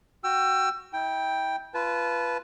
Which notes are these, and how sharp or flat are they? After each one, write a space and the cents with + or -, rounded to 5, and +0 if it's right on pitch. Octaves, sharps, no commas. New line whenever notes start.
F#4 +0 G5 +0 E6 +30
E4 -35 G5 +5
F4 -25 B4 +0 A5 -25